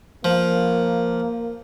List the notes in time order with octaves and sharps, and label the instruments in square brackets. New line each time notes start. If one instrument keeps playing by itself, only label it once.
[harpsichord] F3 [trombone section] A#3